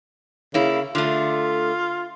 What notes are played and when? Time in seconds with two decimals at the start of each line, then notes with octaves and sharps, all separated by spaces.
0.54 C#3 A#3 E4
0.95 D3 A3 F4